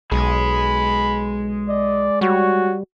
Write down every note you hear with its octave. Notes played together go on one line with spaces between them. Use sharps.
B1 G#3 G#4 B5
D5 D#5
G3 F#4 C#5